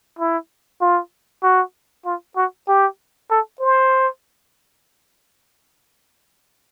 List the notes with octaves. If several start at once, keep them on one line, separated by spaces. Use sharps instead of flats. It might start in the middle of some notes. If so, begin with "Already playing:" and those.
E4
F4
F#4
F4
F#4
G4
A4
C5